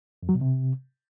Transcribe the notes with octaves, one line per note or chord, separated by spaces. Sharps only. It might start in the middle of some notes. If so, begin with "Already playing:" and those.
F2
F#3
B2
C3